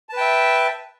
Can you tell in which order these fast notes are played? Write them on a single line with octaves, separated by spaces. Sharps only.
A5 B4 G5 E5